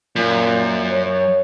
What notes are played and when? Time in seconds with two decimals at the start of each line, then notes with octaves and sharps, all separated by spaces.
0.16 F#2 A#2
0.91 C#5